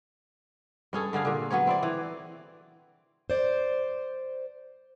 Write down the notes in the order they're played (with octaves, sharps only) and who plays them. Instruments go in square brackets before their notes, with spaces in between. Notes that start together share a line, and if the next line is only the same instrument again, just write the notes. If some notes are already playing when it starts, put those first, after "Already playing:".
[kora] G2 C#4 G#4 A4
G2 D3 G#4 F5
A#2 D3
F#3 B3 C#4 C#5
C4 E4 D5
E3
[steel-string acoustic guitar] C5 D5